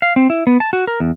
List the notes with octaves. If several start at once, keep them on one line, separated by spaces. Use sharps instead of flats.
F5
C4
E4
B3
A5
F#4
A#4
E2